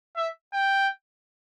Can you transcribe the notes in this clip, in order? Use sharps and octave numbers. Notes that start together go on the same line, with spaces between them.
E5
G5